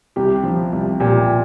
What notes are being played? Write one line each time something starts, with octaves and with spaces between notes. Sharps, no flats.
C2 G4 G5
F3
C2
A#2 G4 G5